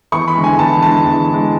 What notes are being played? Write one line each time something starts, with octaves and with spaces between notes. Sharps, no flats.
E2 C#6
B5
D3 G#3
G#5
E2 A5
D3 G#3 A5
E2
D3
G#3